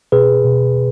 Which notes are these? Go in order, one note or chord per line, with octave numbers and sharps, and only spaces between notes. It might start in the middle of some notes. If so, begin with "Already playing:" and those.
B2 G#4 B4
B2